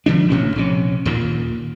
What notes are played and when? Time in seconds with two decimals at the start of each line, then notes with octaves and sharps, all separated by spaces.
0.06 A#1 D3 F3 D4
0.30 A1 A2 C#4
0.56 A#1 C3 C#4
1.05 D#2 A#2 D#3 A#3